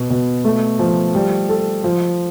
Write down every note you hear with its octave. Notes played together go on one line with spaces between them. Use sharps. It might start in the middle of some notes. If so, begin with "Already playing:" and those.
Already playing: B2
B2
A3
F3
G3
A4
F3